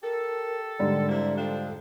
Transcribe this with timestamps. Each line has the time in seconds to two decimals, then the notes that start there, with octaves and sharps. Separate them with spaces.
0.03 G4 A4 A#4
0.79 G#2 D3 G3 D5
1.09 C3 A#3 E4
1.38 F3 C4 D4 A4